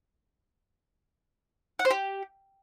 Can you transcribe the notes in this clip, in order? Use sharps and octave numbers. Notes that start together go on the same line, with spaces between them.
F#5
C5
G4